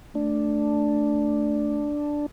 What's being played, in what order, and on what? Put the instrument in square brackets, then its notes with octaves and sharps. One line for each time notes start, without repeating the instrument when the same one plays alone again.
[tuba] A3 [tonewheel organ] D4